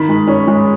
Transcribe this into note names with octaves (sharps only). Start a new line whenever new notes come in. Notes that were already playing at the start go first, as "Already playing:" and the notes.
Already playing: D#3 B5
G#3
C#4
G#3